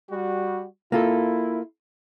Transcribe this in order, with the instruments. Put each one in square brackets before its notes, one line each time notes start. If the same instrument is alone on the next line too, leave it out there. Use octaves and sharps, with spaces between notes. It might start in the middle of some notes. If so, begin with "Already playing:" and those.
[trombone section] G3 F#4
[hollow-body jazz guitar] A#3 F4 A4 [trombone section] E4